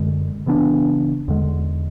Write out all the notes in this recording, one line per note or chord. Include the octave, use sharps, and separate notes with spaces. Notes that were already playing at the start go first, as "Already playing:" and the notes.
Already playing: F#2 D3 G#3
C#3 E3 B3 D4
E2 D3 G#3